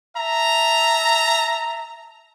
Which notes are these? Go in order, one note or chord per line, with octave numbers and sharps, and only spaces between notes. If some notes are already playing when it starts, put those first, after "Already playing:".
E5 A5 A#5